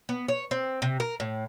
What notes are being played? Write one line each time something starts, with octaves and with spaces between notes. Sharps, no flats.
B3
C#5
C4
C3
A#4
A2